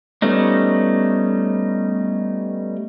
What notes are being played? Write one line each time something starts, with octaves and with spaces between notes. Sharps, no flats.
G3 A3 B3 C#4 D#4